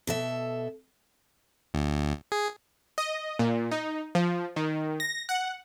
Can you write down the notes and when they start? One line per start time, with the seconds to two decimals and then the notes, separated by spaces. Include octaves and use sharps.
0.07 B2 A4 E5
1.74 D2
2.32 G#4
2.98 D#5
3.39 A#2
3.71 D#4
4.15 F3
4.56 D#3
5.00 A#6
5.29 F#5